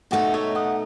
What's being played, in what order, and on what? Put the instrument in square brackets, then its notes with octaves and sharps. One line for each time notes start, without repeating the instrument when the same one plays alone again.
[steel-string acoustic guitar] B2 A3 D#4 [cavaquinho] F#4
[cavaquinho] C#5 E5
D#5 F#5